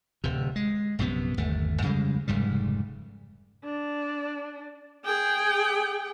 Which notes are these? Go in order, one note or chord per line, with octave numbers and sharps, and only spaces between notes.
D1 C3
G#3
A#1 F#2 C3 B3
G1 D#2 A3
F2 C#3 G3 G#3
F1 G#2 C#3 G3
D4
G#4 G5